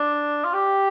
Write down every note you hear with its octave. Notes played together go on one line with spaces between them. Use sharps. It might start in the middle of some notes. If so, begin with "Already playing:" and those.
Already playing: D4
F4
G4